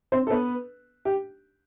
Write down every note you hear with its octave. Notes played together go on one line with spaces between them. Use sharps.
C4 C5
A4
B3 B4
G4